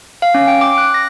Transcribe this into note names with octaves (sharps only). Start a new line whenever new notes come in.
F5
C#4
G5
D6
F#6
A#6